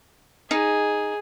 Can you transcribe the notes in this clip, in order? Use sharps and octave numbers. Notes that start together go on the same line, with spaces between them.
D#4 G#4